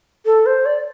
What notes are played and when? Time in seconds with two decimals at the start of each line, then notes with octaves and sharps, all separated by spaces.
0.26 A4
0.46 C5
0.66 D5